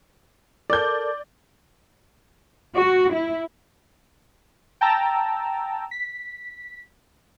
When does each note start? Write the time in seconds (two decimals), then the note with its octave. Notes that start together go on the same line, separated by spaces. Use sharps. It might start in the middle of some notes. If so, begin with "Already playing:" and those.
0.70 A4 A#4 D5 A5 G6
2.75 F#4
3.12 E4
4.81 G5 A5 A#5 E6
5.91 B6